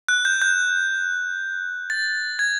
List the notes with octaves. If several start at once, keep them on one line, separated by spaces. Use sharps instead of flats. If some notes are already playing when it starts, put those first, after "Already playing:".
F#6
G6
G6
A6
G#6